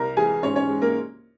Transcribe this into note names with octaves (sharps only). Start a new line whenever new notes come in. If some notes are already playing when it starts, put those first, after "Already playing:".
Already playing: C2 A#4 A#5
E3 G#4 G#5
G#2 C#4 C#5
C#4 C#5
G#3
A#3 A#4